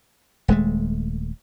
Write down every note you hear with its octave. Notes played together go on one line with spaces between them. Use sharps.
D#1 G#3 A3